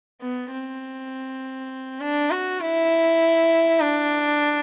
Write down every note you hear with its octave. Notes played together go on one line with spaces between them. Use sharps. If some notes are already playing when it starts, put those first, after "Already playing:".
B3
C4
D4
F#4
E4
D4